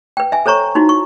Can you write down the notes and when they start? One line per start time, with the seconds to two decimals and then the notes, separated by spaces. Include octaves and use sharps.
0.17 B4 G5
0.32 E5 G#5
0.46 A4 C5 C#5 A#5 C#6
0.75 D#4 E4 F#4
0.89 C#6